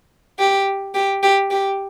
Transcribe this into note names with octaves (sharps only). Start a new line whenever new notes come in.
G4
G4
G4
G4